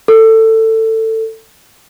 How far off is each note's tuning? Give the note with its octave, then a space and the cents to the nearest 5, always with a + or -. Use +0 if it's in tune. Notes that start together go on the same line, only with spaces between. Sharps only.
A4 +20